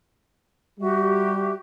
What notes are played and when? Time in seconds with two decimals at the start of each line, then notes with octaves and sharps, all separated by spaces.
0.80 G3 F#4 G4 E5